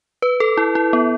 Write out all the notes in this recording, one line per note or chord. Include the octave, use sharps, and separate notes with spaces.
B4
A4
E4
E4
B3